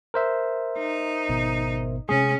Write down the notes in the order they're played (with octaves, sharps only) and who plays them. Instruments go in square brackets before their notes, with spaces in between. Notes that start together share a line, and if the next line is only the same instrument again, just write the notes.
[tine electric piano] A#4 C5 E5
[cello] D#4
[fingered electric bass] G#1 B2 B3
[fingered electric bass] C3 G#3 [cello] C#4 [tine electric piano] G#4